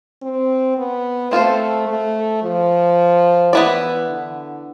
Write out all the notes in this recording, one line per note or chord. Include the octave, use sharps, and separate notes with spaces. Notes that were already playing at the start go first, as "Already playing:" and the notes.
C4
B3
A3 C4 F4 A4 C5
A3
F3
E3 B3 E4 B4 D5
D3